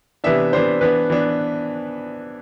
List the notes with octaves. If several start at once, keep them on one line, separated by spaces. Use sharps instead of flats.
C3 E3 B3 D4 E5
C3 E3 B3 D4 C5
E3 B3 D4 B4
E3 B3 D4